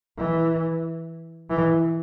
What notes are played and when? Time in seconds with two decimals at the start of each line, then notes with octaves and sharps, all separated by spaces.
0.18 E3
1.50 E3